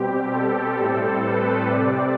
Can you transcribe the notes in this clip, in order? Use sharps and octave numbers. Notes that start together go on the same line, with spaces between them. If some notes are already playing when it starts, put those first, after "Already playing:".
Already playing: B2 G3 C4 G4
A4
A2 G3 C4
B4
C3 G3 C4 D5